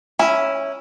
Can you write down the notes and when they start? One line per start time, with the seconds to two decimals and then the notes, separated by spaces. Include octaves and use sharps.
0.19 C#4 E4